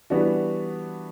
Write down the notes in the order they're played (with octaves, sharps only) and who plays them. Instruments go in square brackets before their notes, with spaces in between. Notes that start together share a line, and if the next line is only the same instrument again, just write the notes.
[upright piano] E3 G3 B3 D4 F#4